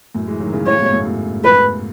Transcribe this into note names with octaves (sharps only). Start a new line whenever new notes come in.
F#2 A2
E3 G#3
D#3 F#3
C#3 E3
A2 C#3 C#5
G#2 B2
F#2 A2
F#2 A2
B4